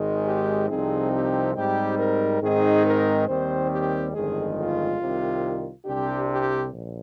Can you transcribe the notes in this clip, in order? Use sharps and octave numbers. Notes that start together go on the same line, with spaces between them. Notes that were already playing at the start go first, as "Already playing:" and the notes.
Already playing: G#1 G#2 D#3 G#3
G4
C2 C3 F3 C4 D#4 G#4
G4
G#2 G3 C4 D#4 G4
A#4
G#2 D#3 G#3 C4 D#4 G#4
A#4
D#2 D#3 G3 C4 C5
G4
G1 F2 D#3 G#3 G#4
F4
C2 C3 D#3
C2 C3 G3 D4 G4
G4
A#1